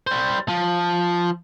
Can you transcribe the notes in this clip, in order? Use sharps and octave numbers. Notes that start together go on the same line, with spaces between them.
G3 C5
F3